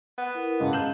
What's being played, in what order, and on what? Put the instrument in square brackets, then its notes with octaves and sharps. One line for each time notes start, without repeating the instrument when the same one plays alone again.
[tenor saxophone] B3
[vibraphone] E4 A#4
[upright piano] G#2 C#3 G#3 [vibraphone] F5 A5
[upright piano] G6 E7 F#7